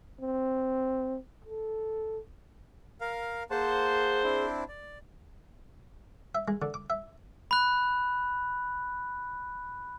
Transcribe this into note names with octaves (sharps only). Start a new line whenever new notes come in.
C4
A4
A#4 F5
A#3 G#4 C5 F#5 A5
C4 D4 E4
D5
E5
G#3
D3
D6
E5
B5 F#6